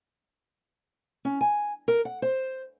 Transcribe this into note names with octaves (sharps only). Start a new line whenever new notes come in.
C#4
G#5
A#4
F#5
C5